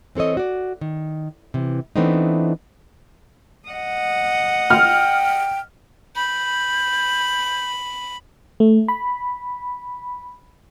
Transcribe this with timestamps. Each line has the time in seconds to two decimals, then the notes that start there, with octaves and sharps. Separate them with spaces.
0.15 E3 C4 A4 C#5 D#5
0.37 F#4 D5
0.81 D#3
1.54 C3 E3
1.96 E3 A3 B3 C4 D4 D#4
3.68 D#5 F#5
4.70 G5 F6
6.16 B5 G6
8.60 A3
8.88 B5